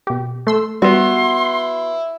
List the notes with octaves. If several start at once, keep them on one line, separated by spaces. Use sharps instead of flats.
B2 G4
A3 C6 E6
G3 B3 E4 F#4 C6